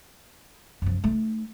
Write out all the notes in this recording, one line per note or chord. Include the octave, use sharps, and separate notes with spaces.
F#2 F3
A3 D#4